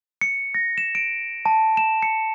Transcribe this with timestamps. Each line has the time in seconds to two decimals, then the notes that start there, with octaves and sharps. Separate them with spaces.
0.21 C#7
0.54 A#6
0.78 E7
0.95 D7
1.46 A5
1.77 E7
2.03 C#7